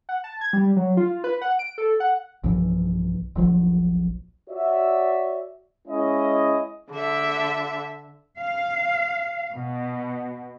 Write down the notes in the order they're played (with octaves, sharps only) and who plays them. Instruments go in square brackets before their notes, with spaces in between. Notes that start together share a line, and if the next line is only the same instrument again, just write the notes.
[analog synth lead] F#5
A5
G#6
G3
F#3
F4
B4
F#5
D7
A4
F#5
[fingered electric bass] B1 G2 E3 F3
E1 A#1 F3 F#3
[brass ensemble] F#4 C#5 D5 E5
G#3 C#4 E4 D#5
[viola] D3 E5
[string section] F5
B2